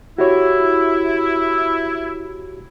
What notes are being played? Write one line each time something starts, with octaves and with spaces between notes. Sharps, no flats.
E4 F#4 G4 C#5